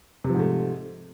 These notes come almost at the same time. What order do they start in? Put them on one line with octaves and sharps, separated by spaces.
C3 F3 G#2 A3